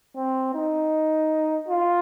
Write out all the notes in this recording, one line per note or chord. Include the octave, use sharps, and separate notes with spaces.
C4
D#4
F4